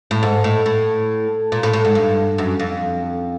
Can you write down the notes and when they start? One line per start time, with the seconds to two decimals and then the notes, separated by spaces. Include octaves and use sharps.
0.11 A2
0.23 G#2
0.44 A2
0.66 A2
1.52 A#2
1.63 A2
1.73 A2
1.85 G#2
1.95 G2
2.38 F#2
2.60 F2